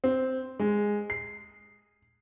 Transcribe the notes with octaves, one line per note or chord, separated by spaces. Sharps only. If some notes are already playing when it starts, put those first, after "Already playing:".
C4
G#3
C7